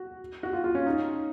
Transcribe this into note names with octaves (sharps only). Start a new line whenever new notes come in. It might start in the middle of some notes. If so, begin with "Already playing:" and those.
Already playing: F#4
F#4
F4
F4
C#4
D#4